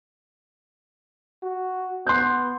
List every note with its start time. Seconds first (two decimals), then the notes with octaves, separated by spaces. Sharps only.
1.43 F#4
2.07 B3 C6 F#6 G6